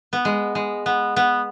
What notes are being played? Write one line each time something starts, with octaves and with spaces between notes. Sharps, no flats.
B3
G#3
G#3
B3
B3